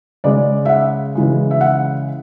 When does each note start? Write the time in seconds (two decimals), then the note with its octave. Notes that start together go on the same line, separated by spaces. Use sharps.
0.24 C#3 G#3 D5
0.65 E5
0.69 F#5
1.15 C#3 E3 G#3
1.51 E5
1.61 F#5